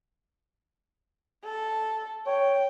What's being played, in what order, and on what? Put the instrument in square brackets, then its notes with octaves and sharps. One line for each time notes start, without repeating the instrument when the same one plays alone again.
[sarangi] A4
[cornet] C#5 [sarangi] G5